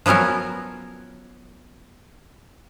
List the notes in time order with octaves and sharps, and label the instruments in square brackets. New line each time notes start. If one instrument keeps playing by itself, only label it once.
[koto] F3 F#3 B3 C#4 A#4